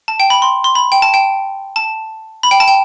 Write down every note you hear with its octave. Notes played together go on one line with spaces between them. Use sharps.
A5
G5
B5
C6
C6
B5
G5
A5
G5
A5
B5
G5
A5
G5